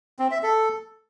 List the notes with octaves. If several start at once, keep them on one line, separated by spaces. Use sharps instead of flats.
C4
E5
A4